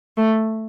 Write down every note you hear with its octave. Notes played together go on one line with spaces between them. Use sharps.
A3